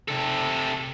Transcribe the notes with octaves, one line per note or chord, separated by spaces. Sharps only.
C3 A4